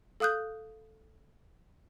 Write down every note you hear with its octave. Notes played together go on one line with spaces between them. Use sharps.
A4 F5 D#6 F#6 G6